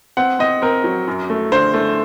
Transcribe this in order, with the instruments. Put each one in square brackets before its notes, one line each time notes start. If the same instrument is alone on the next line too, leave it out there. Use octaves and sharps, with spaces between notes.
[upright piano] C4 [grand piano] F#5
[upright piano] C4 [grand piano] D#5
[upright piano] C4 [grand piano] A#4
[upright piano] F#3
F#2
A3
[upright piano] D3 [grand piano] C5
[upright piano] A3